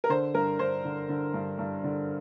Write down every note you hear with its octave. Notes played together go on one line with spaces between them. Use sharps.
A#4
D3 C5
G2 A#4
G2 C5
D3
D3
G2
G2
D3